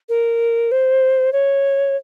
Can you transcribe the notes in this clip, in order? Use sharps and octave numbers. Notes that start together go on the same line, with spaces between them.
A#4
C5
C#5